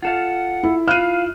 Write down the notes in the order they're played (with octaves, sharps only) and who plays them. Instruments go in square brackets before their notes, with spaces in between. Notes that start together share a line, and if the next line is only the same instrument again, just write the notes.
[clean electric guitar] F4 A4 F5 [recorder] F#5
[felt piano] E4
[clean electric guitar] E4 F4 [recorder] F5 [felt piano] F6 F#6 D#7